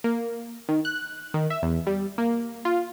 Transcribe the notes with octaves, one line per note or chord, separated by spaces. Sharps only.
A#3
D#3
F#6
D#3
E5
E2
G3
A#3
F4